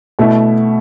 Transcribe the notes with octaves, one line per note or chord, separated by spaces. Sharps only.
B2 A3 E4